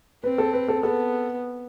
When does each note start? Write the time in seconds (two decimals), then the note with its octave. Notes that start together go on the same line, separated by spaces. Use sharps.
0.24 C4 B4
0.38 A4
0.53 B4
0.68 A4
0.83 B3 A4